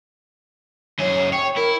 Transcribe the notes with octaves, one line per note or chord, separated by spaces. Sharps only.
F#2 G#4 C#5
C#5 G5
E4 A#4